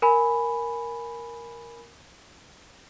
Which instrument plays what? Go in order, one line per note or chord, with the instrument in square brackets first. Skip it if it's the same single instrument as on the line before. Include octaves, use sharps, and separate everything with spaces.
[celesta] A#4 G#5 B5